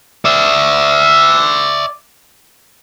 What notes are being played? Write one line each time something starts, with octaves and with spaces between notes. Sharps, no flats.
D5 E5